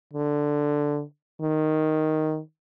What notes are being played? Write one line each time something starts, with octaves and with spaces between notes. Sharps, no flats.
D3
D#3